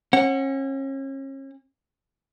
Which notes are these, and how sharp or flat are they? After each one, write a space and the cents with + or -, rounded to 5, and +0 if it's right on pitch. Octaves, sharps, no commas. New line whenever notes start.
C#4 -35 F#5 +0